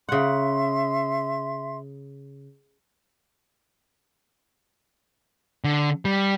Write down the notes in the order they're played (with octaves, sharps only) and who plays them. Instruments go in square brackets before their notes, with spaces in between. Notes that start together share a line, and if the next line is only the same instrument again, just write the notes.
[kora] C#3 F#5 [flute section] E5 C6
[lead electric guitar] D3
G3